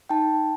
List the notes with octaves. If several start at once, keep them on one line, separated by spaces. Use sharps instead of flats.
D#4 G5 A5